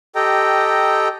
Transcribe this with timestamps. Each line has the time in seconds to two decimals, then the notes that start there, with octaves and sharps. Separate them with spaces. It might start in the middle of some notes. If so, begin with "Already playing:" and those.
0.16 G4 A4 D#5 G5 A#5